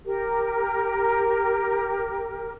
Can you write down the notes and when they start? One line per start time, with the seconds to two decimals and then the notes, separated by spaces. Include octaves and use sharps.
0.06 G4 A#4